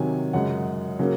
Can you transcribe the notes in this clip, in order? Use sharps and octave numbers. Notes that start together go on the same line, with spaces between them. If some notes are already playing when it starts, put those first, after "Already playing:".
Already playing: C3 D#3 F#3 G#5
F#2 C#3 G#3 F#5
C#3 F#3 A#3